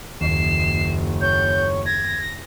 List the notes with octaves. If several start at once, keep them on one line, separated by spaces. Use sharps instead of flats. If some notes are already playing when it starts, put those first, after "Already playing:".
F#1 D#2 C7 E7
C#5 G6
G#6 A#6